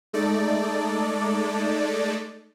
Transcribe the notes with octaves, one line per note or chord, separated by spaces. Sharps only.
G#3 A3 D#4 A4 D5